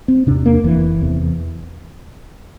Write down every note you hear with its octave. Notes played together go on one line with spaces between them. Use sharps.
C4
E2 C3 D4
A#3
F1 E3
E2 C3